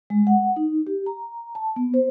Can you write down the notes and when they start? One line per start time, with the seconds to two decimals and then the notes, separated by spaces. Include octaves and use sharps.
0.10 G#3
0.27 F#5
0.56 D#4
0.87 G4
1.06 A#5
1.55 A5
1.76 B3
1.94 C5